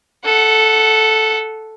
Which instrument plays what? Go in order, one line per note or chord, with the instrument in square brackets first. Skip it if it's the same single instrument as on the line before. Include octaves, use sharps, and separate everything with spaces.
[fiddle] A4 F#5